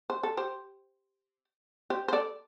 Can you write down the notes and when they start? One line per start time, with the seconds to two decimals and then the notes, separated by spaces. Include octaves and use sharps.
0.10 C5
0.23 A4
0.37 G4 C5
1.90 G4 C5
2.08 C5
2.13 A4 D5